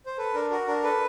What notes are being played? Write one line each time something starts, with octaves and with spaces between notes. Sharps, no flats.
C5
A4 B4
D4 A#4
F#4 A#4
D4 A#4
A4 B4